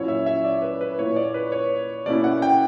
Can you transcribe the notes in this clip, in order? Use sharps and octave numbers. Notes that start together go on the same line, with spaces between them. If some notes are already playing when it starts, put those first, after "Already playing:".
Already playing: A#2 F#3 C#4 E4 C#5
E5
E5
D5
B4
B4
A#2 A#3 E4 C#5
D5
B4
C#5
B2 A#3 C#4 E4 D5
F#5
G5